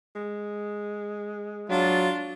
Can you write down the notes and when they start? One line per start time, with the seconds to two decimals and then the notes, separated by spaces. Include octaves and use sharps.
0.16 G#3
1.70 F#3 D4 F4